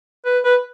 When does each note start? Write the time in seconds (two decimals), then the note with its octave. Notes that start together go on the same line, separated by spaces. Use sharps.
0.25 B4
0.45 B4